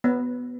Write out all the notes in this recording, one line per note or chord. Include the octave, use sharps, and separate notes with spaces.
B3